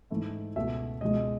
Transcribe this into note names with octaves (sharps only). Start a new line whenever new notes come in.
G#2 E3 A3 E4
C#2 B2 A3 E5
C#2 B2 G#3 D#5